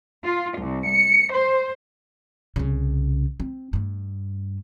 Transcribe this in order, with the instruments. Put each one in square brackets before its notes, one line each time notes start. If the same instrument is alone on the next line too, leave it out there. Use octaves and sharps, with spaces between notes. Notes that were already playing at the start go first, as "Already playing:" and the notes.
[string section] F4
C2
C#7
C5
[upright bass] C2 C#3
C4
G2 A3